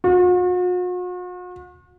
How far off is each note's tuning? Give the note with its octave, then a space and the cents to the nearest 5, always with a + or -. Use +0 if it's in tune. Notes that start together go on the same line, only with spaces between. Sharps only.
F#4 -45